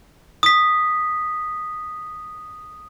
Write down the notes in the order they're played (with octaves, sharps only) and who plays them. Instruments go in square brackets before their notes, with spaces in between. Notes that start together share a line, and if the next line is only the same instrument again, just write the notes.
[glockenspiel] D#6 B6